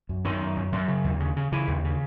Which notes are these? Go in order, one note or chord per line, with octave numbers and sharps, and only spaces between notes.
F#2
F#2 D#3
F#2
F#2
F#2
C#3
D#2
C#3
C#3
C#3 E3
D#2
C#3